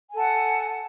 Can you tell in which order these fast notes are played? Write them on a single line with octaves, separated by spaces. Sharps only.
G#5 A4 F#5